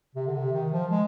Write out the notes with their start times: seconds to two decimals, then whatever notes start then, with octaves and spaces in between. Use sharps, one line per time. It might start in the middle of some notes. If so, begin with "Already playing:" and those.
0.15 C3
0.27 D3
0.34 C3
0.53 D#3
0.72 F3
0.90 G#3